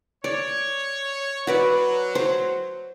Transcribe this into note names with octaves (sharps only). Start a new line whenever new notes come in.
C#5 D5
F#3 F#4 B4 D5
C5